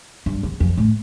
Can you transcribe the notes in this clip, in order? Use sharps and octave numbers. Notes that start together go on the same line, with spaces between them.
G2
E2
F2
A2